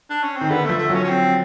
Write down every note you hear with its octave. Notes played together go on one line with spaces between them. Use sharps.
D4
C#4
D#3 C4
D3 B3
F3 A3
A3
F#3 C#4
C#4
C4